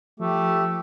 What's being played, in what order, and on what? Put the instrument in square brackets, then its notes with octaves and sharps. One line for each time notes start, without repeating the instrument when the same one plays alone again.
[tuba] F3 [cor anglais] A3 [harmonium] G4